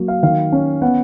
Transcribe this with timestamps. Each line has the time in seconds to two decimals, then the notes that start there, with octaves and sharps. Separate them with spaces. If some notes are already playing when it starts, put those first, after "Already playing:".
Already playing: F#3 A#3
0.08 F5
0.23 D#3 F5
0.52 C#4
0.82 B3 F#5